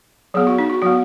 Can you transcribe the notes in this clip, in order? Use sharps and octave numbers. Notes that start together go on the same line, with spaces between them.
F#3 B3 G#4
F#4
D#4
F#4
F#3 B3 F#4